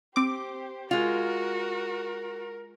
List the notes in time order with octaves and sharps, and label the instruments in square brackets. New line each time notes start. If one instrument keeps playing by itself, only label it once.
[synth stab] C4 D6 [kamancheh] G4 C5
[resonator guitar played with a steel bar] G#3 F4 [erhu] F#4 [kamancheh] A#4